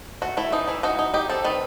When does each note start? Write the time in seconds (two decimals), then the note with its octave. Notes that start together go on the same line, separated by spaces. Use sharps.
0.22 A3 F#4
0.37 A3 E4
0.52 E3 D#4
0.68 E3 E4
0.83 D#4 F#4
0.99 D#4
1.14 D#4 G4
1.30 C4 A4
1.44 D#3 B4